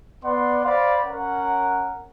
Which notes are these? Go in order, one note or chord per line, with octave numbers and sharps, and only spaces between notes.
B3 D5 F#5 C6
C5 D5 F5 B5
C#4 A#4 F#5